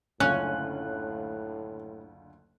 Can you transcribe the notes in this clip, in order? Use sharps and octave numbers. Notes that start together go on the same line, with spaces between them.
F#1 D2 A2 C#4 F4 F#6